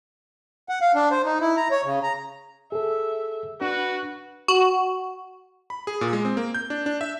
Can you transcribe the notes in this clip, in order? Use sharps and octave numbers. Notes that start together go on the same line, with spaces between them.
F#5
F5
D4
C5
D#4
E4
A#5
C#5
C#3
A#5
G#4 A4 E5
D4 F#4 B4
F#4
B5
G#4
A#2
G#3
C4
A#3
G6
D4
D4
E5